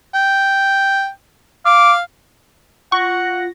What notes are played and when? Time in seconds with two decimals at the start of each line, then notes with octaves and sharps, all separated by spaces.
0.14 G5
1.66 F5 D6
2.92 F4 F#5 C#6 A#6